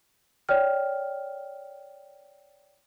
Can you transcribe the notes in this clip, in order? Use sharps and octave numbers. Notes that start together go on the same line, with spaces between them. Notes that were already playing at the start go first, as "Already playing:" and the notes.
C#5 D5 G5 F6